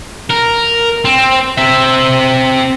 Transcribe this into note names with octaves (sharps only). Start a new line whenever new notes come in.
A#4
C4
C4 E5